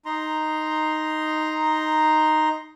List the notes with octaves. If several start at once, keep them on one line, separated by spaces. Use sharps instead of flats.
D#4 A#5 C6